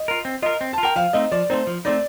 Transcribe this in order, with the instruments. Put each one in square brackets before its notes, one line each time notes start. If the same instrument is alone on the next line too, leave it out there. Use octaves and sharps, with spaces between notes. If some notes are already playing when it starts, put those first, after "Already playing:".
Already playing: [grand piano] D#5
[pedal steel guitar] F4 A#4
C4
[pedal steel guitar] F4 A#4 [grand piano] D#5
[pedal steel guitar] C4
[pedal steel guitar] F4 [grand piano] A5
[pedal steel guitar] A#4 [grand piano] G5
[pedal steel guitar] F3 [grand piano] F5
[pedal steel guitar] A3 C4 D#4 [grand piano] D#5
[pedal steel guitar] F3 [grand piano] D5
[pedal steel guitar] A3 C4 D#4 [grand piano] C5
[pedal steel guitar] F3
[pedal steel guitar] A3 C4 D#4 [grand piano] D5